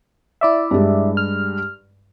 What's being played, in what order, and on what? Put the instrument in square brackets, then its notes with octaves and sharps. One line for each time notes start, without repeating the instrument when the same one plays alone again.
[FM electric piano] E4 D5 E5
[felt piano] G2 G#3
[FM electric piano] F6